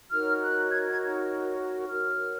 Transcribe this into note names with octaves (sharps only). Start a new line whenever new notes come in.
D#4 F#4 A#4 C#5 F6
F#6
G#6
G#6
F#4 A#4 C#5 F6